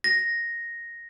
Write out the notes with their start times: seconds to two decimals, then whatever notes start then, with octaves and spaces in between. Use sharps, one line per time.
0.04 A#6